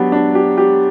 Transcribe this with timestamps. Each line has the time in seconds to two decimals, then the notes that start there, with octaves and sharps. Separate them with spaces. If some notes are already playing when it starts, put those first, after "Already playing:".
Already playing: F#3 B3 D4 G4
0.12 D4
0.35 G4
0.57 G4